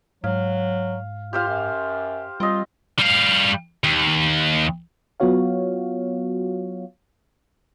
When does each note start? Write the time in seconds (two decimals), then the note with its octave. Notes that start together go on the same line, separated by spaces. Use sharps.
0.24 G#2 F#3 F5
1.33 F4 G4 C5 F5
1.47 F#2
2.40 G3 C4 F4 D#5
2.99 G3 F5
3.84 D#2
5.20 F#3 B3 F4 F#4 C#5 F5